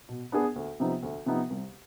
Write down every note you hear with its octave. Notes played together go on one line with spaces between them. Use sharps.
B2
B3 D4 G#4
D2
C3 F3 B3 D#4
D2
C3 F3 B3 D#4
C2